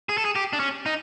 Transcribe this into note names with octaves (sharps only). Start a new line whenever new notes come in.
G#4
A4
G#4
G4
D4
C#4
D#4